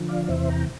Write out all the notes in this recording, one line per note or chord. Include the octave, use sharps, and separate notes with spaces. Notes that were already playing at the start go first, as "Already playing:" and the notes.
Already playing: D3 F3
D5 F5
E2 C3 E3 C5 E5
G5 A#5